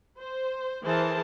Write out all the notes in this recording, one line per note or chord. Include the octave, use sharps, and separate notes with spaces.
C5
E3 G#4 A#4 C5 A5